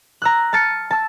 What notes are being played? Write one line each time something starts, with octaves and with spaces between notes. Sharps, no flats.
A#5 E6 F#6
A5 F6 A6 C#7 D#7
A5 E6